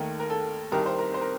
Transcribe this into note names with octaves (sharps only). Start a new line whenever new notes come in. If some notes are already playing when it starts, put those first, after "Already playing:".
Already playing: D#2 D#3 A3 A#4
A#4
A4
C2 C3 D#3 G3 A#4
C5
A#4
C5
A#4